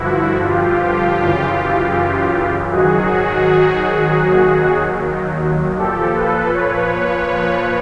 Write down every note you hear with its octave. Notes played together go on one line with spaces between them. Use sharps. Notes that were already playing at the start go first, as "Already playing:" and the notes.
Already playing: G2 D3 F3 E4 F#4
F4 G4
F#2 C#3 E3
G#2 D#3 F#3 F#4 G#4
D#2 D#3 F#3
A#2 F3 G4 A4
A4 B4
B4 C#5
A#2 F3